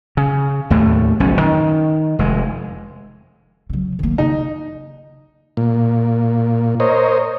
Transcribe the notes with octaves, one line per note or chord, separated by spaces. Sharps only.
C#3
D#2 A2 A3
F#1 B1 F3 C#4
D#3
F1 G#3
C#3 F#3
D#3 A#3
C#3 D#4
A#2
A#4 C5 C#5 D#5